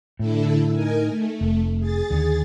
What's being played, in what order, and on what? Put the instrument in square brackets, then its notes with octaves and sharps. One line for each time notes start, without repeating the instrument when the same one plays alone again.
[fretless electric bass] A2 [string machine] D3 E4 A4
[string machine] D#4 A#4 G#5
A3
[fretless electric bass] F1
[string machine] G#4 A6
[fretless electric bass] D#2 D3